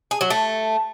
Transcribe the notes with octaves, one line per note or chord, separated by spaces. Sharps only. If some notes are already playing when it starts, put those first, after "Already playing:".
G#4
F#3
A3